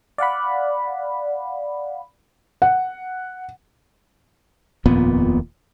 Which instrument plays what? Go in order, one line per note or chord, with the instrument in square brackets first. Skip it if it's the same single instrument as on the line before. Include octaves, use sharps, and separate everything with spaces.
[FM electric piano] D5 F5 F#5 B5
[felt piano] F#5
[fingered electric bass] D#1 F2 A#2 B3